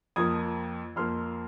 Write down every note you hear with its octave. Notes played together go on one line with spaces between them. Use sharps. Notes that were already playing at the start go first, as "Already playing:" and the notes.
F2 F3 A#3 D#6 G#6
F2 F3 A#3 C6 F6